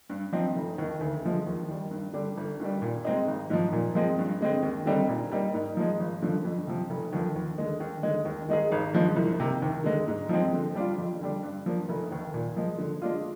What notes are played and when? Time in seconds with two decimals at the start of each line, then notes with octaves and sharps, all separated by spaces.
0.10 G2
0.33 F3 C4 D#4
0.56 F1
0.78 D#2 D#3
1.01 D2
1.23 D3 F3 G#3
1.46 D#2
1.68 D#3 G3
1.91 G2
2.13 D3 G3 D4
2.37 G1
2.60 G2 D#3 G3
2.82 A#2
3.05 G#3 C4 D#4
3.27 G#1
3.50 G#2 F3
3.73 A#2
3.95 F3 G#3 C4
4.19 G2
4.41 D3 G#3 C4
4.63 D#2
4.86 D3 G3 C4 D#4
5.09 A#2
5.32 G3 A#3 D#4
5.54 G#2
5.77 F3 G#3
6.00 G#1
6.22 G2 D3 F3
6.45 F2
6.67 C3 F3
6.90 F1
7.13 D#2 D3 F3
7.36 D#2
7.58 D3 G#3
7.80 D#2
8.03 D3 G#3
8.25 D#2
8.49 D#3 G#3 D#4 G#4
8.72 G#1
8.94 G2 F3 G#3
9.16 C2
9.40 C3 D#3 A#3
9.62 D#2
9.84 D3 G#3
10.08 G#2
10.29 F3 G#3 C4
10.53 D3
10.75 G3 D4 F4
10.98 F2
11.20 D3 G3 D4
11.43 G2
11.66 F3 A#3 D4
11.89 F1
12.11 D#2 D#3
12.34 A#2
12.57 F3 G#3
12.78 D3
13.02 G#3 D4 F4